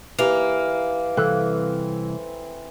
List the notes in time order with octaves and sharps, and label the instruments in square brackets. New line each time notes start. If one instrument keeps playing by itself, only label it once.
[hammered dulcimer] E3 [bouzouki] A#3 [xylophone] G4 B4 F7
[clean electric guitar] C2 E3 [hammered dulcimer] C4 [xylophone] A4 F5 F#6